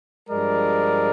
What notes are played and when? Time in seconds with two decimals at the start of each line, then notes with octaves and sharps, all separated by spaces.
0.29 G2 F3 G#3 A#4 D5